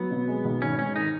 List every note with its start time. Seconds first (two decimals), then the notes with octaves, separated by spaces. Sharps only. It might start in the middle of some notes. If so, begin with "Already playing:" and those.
Already playing: F#3 B3
0.11 B2
0.28 G#3
0.45 B1
0.62 G#1 C#4
0.79 G#2 C#4
0.96 D#3 D#4